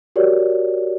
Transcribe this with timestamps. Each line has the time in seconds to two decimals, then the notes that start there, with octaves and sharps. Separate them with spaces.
0.16 F#4 G4 A#4 C#5 D5